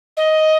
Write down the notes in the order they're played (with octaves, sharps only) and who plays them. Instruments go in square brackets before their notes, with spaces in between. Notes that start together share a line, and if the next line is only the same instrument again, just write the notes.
[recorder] D#5